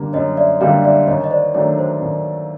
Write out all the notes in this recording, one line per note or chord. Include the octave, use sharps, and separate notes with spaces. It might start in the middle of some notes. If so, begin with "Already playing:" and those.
Already playing: F#2 D3 G3 A#3
F#2 C#5 D#5
D5 E5
D3 G3 A#3 D#5 F5
D5 E5
D#2 C#5 D#5
D#5
C5 D5
D#3 F#3 A3 D4 C#5
C5
D#2